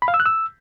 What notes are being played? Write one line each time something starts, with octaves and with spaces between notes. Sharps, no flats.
B5
F5
E6
F#6
E6